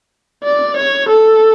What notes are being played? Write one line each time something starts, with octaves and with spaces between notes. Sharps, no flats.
D5
C#5
A4